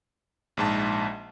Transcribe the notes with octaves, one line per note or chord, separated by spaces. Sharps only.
A#1 G#2 A5